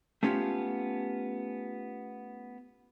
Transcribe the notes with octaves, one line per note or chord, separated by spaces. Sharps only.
A3 B3 C#4 F4 G4